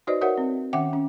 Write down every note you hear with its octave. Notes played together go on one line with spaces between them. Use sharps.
D#4 F#4 B4 C5 D5 D#5
F#4 A#4 C#5 D#5 E5 F#5
C4
D#3 C#4 E5 F#5 G5 D6
C#4